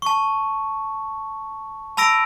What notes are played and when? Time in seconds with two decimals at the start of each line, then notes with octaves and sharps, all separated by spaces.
0.02 A5 C#6
1.97 A5 B5 E6 A#6 D7